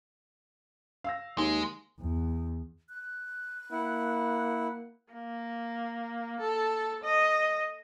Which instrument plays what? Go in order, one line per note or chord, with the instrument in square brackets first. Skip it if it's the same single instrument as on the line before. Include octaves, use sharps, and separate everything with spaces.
[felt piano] F5 E6 A#6
[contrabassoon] D#2 [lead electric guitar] G#3
[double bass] E2
[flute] F#6
[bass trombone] A#3 [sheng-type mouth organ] E4 [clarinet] F#5
[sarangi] A#3
A4
D#5